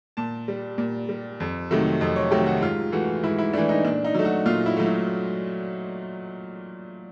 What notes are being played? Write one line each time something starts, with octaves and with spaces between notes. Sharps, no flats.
A#2 A5
G3
A#2
G3
F2
C3 D#3 F#3 A3
F2 D#5
C#5
C3 D#3 F#3 A3 G4
F#4
G#2 F4
E3 A3 F#4
G#2 E4
E4
E3 A3 D4
D#4
A#2 D4
D#4
F#3 A3
F#4
A#2 F4
E4
F#3 A3
E4